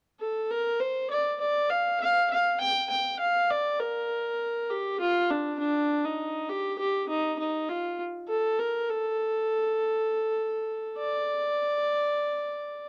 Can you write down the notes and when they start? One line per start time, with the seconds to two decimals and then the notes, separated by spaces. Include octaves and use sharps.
0.20 A4
0.50 A#4
0.80 C5
1.10 D5
1.40 D5
1.70 F5
2.00 F5
2.30 F5
2.60 G5
2.90 G5
3.20 F5
3.50 D5
3.80 A#4
4.70 G4
5.00 F4
5.30 D4
5.59 D4
6.05 D#4
6.49 G4
6.79 G4
7.09 D#4
7.39 D#4
7.69 F4
8.29 A4
8.59 A#4
8.89 A4
10.98 D5